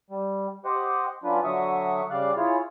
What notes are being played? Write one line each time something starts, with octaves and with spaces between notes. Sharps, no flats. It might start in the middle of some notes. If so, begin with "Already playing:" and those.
G3
G4 C5 D#5 F#5
F#3 C#4 D4 F4 B4
D3 F#3 F#4 E5 C#6 D#6
C#3 G3 D5 F5 F#6
E4 F4 G#4 C#5